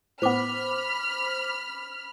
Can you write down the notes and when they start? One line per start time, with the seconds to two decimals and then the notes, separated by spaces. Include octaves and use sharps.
0.22 A2 B3 C5 B5 D6 F6